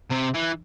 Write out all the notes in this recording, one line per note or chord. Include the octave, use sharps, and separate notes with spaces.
C3
E3